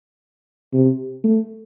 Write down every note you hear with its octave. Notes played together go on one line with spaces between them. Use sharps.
C3
A3